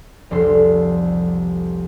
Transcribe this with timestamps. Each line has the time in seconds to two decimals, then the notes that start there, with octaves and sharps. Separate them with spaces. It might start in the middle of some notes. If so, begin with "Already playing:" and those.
0.31 F1 C2 A4 C6